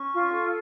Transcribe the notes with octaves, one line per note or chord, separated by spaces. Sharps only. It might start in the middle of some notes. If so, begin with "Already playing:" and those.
Already playing: C#4 C#6
F4
A4